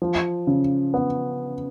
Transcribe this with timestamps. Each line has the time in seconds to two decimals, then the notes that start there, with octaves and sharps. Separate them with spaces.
0.02 F3
0.47 C#3
0.94 B3